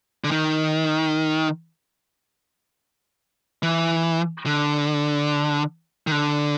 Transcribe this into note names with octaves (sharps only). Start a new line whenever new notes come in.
D3
D#3
E3
D3
D#3
D3